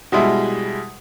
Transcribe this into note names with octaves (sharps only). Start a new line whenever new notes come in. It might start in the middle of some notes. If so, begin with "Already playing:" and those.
B2 G3 G#3 E4